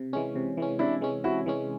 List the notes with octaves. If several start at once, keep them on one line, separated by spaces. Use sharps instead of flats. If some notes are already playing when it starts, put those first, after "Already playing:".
Already playing: C3
E3 G#3 C#4
C3
E3 G#3 C#4
C3 D4 E4
E3 G#3 C#4
C3 E4 F#4
E3 G#3 C#4